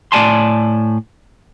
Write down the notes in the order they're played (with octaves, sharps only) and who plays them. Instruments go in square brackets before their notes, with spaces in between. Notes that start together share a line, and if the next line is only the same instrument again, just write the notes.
[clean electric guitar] A2 D5 G#5 A5 C6